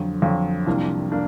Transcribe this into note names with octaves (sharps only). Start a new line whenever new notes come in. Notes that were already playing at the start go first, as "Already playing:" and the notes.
Already playing: F2 D3 F#3
F2 D3 F#3
C2 C3 F3 A#3 D4
A#3 D4